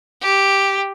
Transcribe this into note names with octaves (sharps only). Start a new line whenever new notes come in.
G4